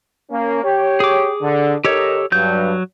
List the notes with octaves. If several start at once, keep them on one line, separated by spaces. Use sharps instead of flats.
A#3 C#4
G4 C#5
G#4 D6
D3
D#4 G4 A4 A#4 C#5 D#5
G2 F#3 G6